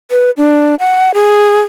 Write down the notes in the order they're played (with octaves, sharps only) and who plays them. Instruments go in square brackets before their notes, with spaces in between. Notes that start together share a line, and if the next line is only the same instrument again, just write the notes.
[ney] B4
D4
F#5
G#4